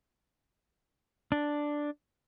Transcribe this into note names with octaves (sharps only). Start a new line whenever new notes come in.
D4